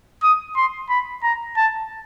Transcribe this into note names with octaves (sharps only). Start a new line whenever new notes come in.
D#6
C6
B5
A#5
A5